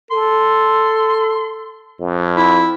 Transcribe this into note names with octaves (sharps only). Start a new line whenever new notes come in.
A4 C6
F2
E4